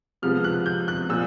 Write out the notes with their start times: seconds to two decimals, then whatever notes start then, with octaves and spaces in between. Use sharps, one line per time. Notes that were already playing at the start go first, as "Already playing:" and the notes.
0.22 C3 F3 G#3 B3 F6
0.44 F#6
0.66 G6
0.88 F#6
1.09 A#2 F3 E6